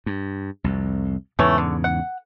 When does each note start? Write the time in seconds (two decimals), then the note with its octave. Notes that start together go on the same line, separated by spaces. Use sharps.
0.06 G2
0.64 C2 F2
1.39 E2 G#2 C#3 E3 A3 C#5
1.58 D3
1.84 F#5